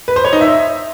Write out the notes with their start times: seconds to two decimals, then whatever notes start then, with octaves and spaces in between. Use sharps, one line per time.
0.08 B4
0.16 C5
0.24 C#5
0.33 D#4
0.41 E5